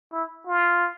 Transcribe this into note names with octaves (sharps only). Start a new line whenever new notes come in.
E4
F4